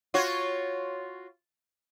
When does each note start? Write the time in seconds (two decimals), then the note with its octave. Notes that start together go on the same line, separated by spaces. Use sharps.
0.14 F4 F#4 C#5